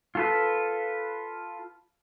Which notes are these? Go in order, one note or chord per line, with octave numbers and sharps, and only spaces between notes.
F4 A4 B4